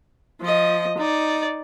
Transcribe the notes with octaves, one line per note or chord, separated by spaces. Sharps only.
F3 D#5
D#4 D5